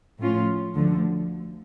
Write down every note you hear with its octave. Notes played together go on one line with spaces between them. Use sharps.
A2 F3 C#4 F4
D2 D3 F3